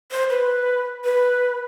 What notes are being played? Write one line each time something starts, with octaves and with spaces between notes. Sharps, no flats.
C5
B4
B4